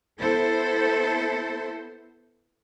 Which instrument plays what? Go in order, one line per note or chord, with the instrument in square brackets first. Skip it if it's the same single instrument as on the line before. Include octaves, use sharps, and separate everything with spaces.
[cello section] B3 E4 A4 C5